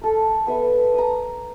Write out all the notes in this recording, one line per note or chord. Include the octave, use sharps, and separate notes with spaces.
A4 A#4
B3 B4 E5
A#5 D#6